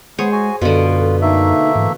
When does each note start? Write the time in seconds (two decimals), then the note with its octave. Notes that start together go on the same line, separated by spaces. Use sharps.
0.18 G#3 B3 G#4 C5 C#5
0.32 F#4 G#5
0.61 F#2 B2 D3 F4 A4
1.21 A3 A#3 D#4 E5
1.76 G#2 E3